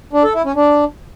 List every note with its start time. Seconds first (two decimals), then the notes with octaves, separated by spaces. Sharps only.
0.13 D4
0.24 A4
0.34 E4
0.45 C#4
0.56 D4